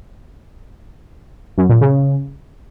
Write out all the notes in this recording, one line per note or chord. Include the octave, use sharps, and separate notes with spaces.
F#2
A#2
C#3